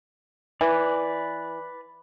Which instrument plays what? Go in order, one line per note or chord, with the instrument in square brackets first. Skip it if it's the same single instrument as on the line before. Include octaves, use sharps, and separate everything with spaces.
[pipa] E3 [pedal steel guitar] B4 D5